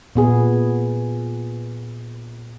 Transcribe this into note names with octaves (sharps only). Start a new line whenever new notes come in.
A#2 B3 G#4